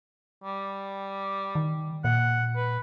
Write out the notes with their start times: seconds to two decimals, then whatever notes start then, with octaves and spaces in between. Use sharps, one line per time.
0.43 G3
1.55 D#3
2.04 A#2 F#5
2.56 B4